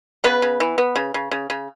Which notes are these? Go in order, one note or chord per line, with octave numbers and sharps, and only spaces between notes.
C#3 B3 B4
C#3
E3
B3
C#3
C#3
C#3
C#3